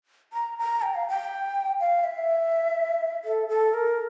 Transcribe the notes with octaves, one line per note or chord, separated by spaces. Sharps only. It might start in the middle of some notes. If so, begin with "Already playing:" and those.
A#5
A#5
G5
F5
G5
F5
E5
A4
A4
A#4